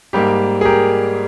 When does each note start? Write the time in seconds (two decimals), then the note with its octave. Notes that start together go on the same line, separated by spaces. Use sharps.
0.13 G#2 G3 A#3 G4
0.61 G#4
0.65 G4 A#4